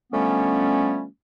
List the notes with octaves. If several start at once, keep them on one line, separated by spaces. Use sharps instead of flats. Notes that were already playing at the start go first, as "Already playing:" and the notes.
D3 F3 G3 A3 B3 C#4